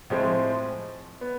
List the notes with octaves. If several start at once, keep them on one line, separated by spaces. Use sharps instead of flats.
A2 F3 G#3 C4
B3